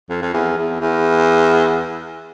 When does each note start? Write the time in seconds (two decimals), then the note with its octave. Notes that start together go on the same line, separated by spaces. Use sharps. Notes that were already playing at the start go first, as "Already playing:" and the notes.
0.10 F2
0.22 F2
0.33 E2
0.57 E2
0.80 E2